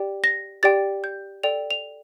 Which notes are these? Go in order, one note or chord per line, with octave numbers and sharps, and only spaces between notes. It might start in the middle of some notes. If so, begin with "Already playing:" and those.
Already playing: G4 D5 G5
A#6
G4 D5 G5 A6
G6
A4 D5 G5 F7
F7